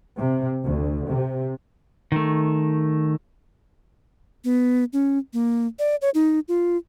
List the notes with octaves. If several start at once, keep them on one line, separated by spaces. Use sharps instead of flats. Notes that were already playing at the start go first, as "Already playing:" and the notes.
C3
D2
C3
D#3 A3
B3
C#4
A#3
D5
C#5
D#4
F4